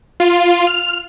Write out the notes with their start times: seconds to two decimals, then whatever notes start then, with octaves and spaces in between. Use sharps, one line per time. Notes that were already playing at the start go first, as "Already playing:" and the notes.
0.20 F4
0.67 F6